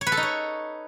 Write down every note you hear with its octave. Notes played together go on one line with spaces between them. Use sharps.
C#5
B4
A4
D#4
C#5